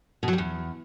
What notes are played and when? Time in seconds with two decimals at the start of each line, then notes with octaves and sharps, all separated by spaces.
0.23 B2
0.28 F#3
0.33 G3
0.38 E2